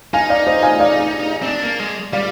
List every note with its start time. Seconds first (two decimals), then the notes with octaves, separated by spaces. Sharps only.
0.13 D#4 F5 G#5
0.30 D5 F5
0.47 C5 D#5
0.63 F5 G#5
0.80 D5 F5
1.42 C4
1.46 D4
1.63 A#3
1.80 G#3
2.13 G3 D5 F5